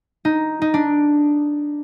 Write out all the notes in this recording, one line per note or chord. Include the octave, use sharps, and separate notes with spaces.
D#4
D#4
D4